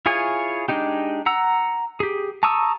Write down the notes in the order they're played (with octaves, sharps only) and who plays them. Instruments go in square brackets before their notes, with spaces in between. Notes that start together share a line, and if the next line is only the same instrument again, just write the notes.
[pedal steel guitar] E4 F4 G#4 C#5 G#5
G#3 D4 D#4 G4
F#5 A#5 E6
G4 G#4
A5 A#5 C#6 D#6 E6